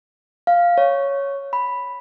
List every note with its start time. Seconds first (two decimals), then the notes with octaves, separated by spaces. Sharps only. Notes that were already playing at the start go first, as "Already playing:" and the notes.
0.47 F5
0.78 C#5
1.53 B5